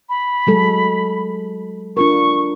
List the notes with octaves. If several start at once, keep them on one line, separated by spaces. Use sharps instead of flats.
B5
F#3 G#3 A4
D4 F4 A#4 C#6